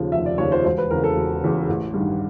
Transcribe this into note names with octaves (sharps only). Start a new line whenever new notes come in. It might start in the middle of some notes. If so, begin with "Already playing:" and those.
Already playing: D#2 C#3 F3
F1 E5
D5
D#2 C#3 F3 C#5
C5
E1 C5
B4
E2 C#3 A#4
A4
E1
E2 C#3
A1
G2 D#3